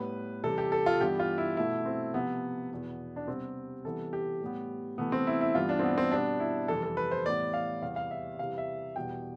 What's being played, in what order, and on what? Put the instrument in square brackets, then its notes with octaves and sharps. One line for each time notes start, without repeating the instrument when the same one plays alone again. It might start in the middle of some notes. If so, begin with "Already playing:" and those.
Already playing: [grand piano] A2 G3 B3 B4
C3 E3 G3 A4
G4
A4
F4
G2 E3 B3 G4
F4
E4
B2 A3 E4
C4
C3 F3 B3
E2 B2 B3
D4
C3 G3 B3 C4
C3 E3 G3 B3 A4
G4
A2 G3 B3
C3 E3 A3 B3
C4
E4
E4
G2 E3 G3 B3 F4
D4
C4
B3
C4
B2 G3 B3 D4
E4
F2 C3 E3 G3 A4
A4
B4
C5
A2 E3 G3 B3 D5
F5
E2 C3 G3 B3 F5
F5
E5
E2 C3 E3 G3 F5
E5
E2 B2 G3 G5